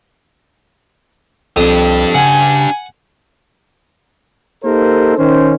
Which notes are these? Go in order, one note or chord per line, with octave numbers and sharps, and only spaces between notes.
C2 F2 D4 G4 D#6
C#3 F#5 G#5
A#3 D#4 G4 A4 A#4 C5
D#3 C#4 C5